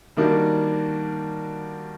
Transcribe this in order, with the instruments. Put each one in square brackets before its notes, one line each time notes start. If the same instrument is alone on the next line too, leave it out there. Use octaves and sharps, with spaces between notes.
[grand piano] D#3 G3 A#3 D4 F#4